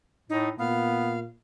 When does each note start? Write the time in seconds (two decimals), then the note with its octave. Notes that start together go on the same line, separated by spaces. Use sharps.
0.30 A2 D#4
0.59 A#2 B3 F5